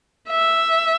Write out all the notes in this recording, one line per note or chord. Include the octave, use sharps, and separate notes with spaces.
E5